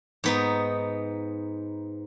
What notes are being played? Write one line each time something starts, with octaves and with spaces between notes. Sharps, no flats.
G#2 B3 D#4